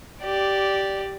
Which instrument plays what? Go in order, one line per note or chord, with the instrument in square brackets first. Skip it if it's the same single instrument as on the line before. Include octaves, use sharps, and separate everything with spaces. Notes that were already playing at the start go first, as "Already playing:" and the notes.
[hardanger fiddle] G4 D5